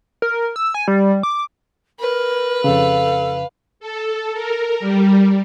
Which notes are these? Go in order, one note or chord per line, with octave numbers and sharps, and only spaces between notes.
A#4
E6
G#5
G3
D6
A#4 B4
F2 C#3 A4 F5
A4
A#4
G3